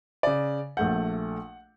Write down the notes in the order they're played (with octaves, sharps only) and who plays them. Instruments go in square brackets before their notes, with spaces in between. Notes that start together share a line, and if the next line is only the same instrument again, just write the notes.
[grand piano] C#3 D5
[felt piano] A#1 A3 G6 [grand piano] F#5